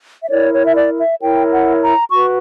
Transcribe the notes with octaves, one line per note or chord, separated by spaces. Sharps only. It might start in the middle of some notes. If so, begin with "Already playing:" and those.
E5
E4 A#4 C#5 D5
C#5
E5
D5
E5
E4 A#4 C#5 G5
F#5
A#5
F#4 B4 C#6